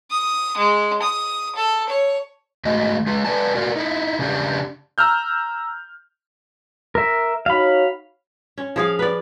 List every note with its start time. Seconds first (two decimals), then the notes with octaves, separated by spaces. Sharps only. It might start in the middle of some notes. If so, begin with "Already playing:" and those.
0.11 D#6
0.57 G#3
1.02 D#6
1.55 A4
1.89 C#5
2.65 G#2 D#3 A3 F#4 D#5
3.06 G#3 F4
3.25 B4 D5 G#5 A5
3.55 F4 F#4 A#4 D5
3.76 D#4 E4
4.19 C#3 C#4 D4 G4
4.98 A#5 E6 F6 G6
6.95 A#4 E5
7.46 D#4 F#4 C#5 F5 B5
8.58 C#4
8.76 F3 G#4 F5
8.99 B4 D5